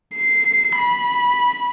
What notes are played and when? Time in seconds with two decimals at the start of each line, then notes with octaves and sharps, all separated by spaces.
0.16 C7
0.78 B5